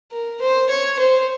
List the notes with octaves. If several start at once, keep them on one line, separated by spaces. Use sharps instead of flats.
A#4
C5
C#5
C5